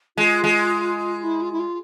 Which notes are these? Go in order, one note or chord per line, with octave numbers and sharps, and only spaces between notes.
G#3 F4
G#3
E4
F4
E4
F4